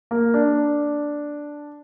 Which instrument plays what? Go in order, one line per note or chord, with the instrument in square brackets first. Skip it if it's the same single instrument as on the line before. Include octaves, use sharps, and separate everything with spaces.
[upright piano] A#3
D4